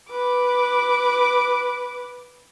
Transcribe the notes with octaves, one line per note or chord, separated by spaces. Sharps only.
B4 D6